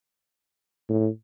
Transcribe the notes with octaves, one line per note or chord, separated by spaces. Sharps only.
A2